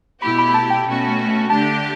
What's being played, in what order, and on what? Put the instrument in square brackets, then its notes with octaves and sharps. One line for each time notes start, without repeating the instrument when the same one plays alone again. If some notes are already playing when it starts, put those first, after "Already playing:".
[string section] B2 A3 E4 G4 [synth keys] B5
[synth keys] B5
B5
A5
G5
[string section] B2 A3 C#4 F#4
[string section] D3 A3 D4 G4 [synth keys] A5